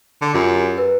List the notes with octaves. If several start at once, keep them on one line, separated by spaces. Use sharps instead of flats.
D3
F#2 F4 G4
B4